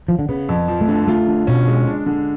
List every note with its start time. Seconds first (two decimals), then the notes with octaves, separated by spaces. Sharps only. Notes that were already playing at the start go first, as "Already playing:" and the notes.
0.08 F3
0.19 D3
0.29 C#3 B3
0.49 F2
0.68 F3
0.81 A3
0.88 D3
1.08 A3 F4
1.28 D3
1.47 B2 C#4
1.68 G#3
1.88 D4
2.06 D3